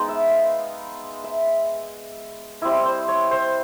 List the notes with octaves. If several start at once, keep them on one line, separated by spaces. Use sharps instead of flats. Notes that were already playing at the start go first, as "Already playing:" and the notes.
Already playing: G#3 B3 D#4
E5
F5
E5
G3 C4 E4 D#5
C5
C#5
C5